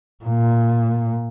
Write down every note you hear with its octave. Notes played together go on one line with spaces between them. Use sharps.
A#2